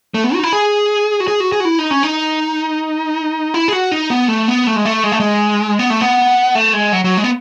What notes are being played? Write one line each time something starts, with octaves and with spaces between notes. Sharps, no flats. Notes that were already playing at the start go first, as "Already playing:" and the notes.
A3
B3
F#4
D#4
E4
G#4
F#4
G#4
F#4
G#4
F#4
E4
D#4
C#4
D#4
E4
G#4
F#4
D#4
B3
A3
B3
A3
G#3
A3
G#3
A3
G#3
B3
A3
B3
A3
G#3
F#3
F#3
G#3
B3